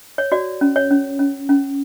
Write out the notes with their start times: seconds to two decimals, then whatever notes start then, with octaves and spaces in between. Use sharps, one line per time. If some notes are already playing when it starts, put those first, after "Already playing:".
0.18 C#5
0.32 F#4 D5
0.61 C#4
0.76 C#5
0.91 C#4
1.19 C#4
1.49 C#4